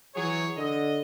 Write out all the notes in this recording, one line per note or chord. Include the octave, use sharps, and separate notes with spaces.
E3 F#3 G#4 C#5
D3 D#5